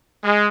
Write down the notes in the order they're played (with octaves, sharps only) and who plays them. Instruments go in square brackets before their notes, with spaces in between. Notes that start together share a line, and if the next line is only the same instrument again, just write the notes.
[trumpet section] G#3